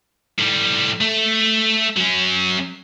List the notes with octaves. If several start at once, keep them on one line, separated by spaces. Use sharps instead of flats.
A2 G3
A3
F#3 C#4